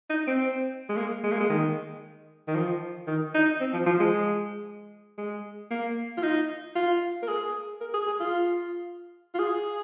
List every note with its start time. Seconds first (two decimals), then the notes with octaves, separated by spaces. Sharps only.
0.10 D#4
0.27 C4
0.89 G#3
0.97 A#3
1.23 G#3
1.32 A#3
1.40 G#3
1.50 D#3
2.48 D#3
2.55 F3
3.07 D#3
3.34 D#4
3.60 C4
3.73 F3
3.86 F3
3.99 G#3
5.18 G#3
5.70 A#3
6.17 F4
6.23 D#4
6.75 F4
7.23 A#4
7.28 G#4
7.81 A#4
7.94 G#4
8.07 G#4
8.20 F4
9.34 F4
9.39 G#4